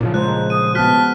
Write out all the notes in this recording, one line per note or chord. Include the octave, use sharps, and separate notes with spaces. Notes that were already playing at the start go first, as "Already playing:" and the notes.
A#2 C#3 F3 E4
G#3 C5 A#5 F#6
D#6 D#7
B3 F#4 A5 F6 F#6 B6